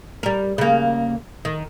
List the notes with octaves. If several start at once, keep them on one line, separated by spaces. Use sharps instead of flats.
G3 A#4
C#3 A#3
D#3